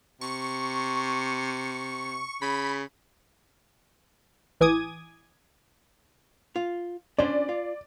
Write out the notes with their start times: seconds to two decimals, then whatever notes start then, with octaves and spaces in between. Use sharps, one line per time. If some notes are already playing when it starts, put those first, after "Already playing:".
0.21 C3 C#6
2.42 C#3 B5
4.60 A1 E3 G#5 D6 D#6 G#6
6.56 F4
7.18 C#4 D4 C5 D5
7.49 F4